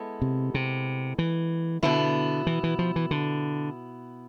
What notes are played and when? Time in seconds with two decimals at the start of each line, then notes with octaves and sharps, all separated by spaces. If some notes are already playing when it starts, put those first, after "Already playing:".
Already playing: G#3 B3 E4 A4
0.22 C3
0.54 C3
1.19 E3
1.83 B2 D3 B3 E4
2.47 E3
2.63 E3
2.79 F3
2.96 E3
3.11 D3